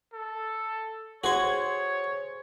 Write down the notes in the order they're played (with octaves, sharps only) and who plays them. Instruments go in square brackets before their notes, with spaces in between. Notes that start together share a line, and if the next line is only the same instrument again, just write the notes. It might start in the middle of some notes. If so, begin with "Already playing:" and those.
[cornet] A4
[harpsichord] F#4 C#6 [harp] G#4 C5 [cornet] C#5